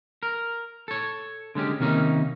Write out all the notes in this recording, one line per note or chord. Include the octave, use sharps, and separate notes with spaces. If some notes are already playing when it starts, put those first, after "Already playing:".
A#4
A4 C#5
D3 G#3 C#4 G4
C3 D#3 A#3 C#4 D#4